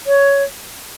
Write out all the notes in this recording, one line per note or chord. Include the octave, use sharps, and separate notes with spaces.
C#5